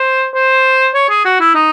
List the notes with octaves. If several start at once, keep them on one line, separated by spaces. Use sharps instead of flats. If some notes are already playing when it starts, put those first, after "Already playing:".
Already playing: C5
C5
C#5
G#4
F#4
E4
D#4